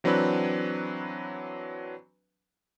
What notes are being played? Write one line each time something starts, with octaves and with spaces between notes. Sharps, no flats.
E3 F#3 C4 D4 B4